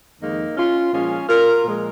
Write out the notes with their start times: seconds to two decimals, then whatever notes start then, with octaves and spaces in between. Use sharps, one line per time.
0.21 F2 D#3 G#3 A#3 D#4
0.57 C#4 F4
0.93 A#2 F3 G#3 C#4 F4
1.28 F4 A#4
1.64 A#2 F3 G#3